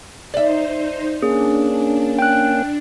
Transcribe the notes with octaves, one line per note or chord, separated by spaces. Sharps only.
D#4 C5 D5 E5
A#3 C#4 D4 G#4
G5 F#6